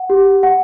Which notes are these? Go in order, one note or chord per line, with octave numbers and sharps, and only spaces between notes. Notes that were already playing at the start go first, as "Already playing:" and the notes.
Already playing: F#5
G4
F#5